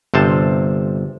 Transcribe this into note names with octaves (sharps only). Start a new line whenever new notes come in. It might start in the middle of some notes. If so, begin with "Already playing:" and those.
G1 C3 C5 A5